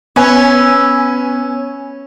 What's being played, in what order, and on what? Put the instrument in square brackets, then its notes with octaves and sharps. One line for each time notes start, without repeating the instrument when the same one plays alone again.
[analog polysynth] B3 G#5 [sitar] C#4 [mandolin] B4 E5